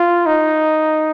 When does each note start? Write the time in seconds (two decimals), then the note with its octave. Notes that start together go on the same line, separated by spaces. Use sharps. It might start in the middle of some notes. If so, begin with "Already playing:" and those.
Already playing: F4
0.26 D#4